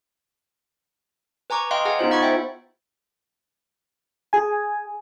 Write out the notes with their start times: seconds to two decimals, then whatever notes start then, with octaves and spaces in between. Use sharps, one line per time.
1.50 B4 G#5 A#5 C#6 D6
1.71 D#5 F5 G5 C6 F#6
1.85 G#4 D#5 F#5 G#5
1.99 B3 D#4 F4 C5
2.11 F4 F#5 B5 C#6 G#6 A6
2.23 C5 E5 G5
4.33 G#4 G#5